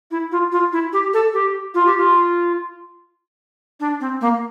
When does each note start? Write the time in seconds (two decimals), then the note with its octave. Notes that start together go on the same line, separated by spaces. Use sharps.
0.11 E4
0.31 F4
0.52 F4
0.72 E4
0.92 G4
1.13 A4
1.33 G4
1.74 F4
1.86 G4
1.97 F4
3.80 D4
4.00 C4
4.21 A#3